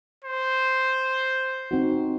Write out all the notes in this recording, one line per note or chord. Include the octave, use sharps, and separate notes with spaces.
C5
C4 D#4 F#4